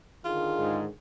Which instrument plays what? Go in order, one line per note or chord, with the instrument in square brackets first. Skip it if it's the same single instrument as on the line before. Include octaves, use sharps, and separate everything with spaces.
[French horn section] D3 D#3 G#4 [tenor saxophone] F4
[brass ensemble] G#2 G#3